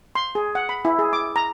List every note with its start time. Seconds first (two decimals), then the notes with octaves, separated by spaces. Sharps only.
0.15 C6
0.35 G#4
0.55 F#5
0.69 B5
0.85 E4
0.99 G#4
1.13 D6
1.36 A#5